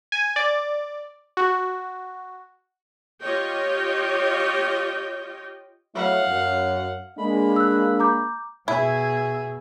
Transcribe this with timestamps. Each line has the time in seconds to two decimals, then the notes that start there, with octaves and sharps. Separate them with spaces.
0.12 G#5
0.36 D5
1.37 F#4
3.22 F4 G4 C#5 D#5 G5
5.95 F#3 A3 E4 F5 F#5
6.28 F#2
7.18 G#3 A#3 D4 B5
7.56 E6 F#6
8.00 A#5 D6 G6
8.68 B2 E4 G#4 E5